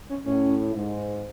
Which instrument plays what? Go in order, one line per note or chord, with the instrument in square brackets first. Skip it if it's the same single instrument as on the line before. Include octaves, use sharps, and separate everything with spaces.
[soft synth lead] C#4
[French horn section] A2 [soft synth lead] C#4
[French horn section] G#2